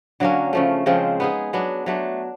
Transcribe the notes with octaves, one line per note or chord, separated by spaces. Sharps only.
D3 F#3 A#3 C#4
C#3 F3 A3
C#3 F3 G#3 C4
B3 D#4 G#4
F#3 B3 D4
F#3 A3 D4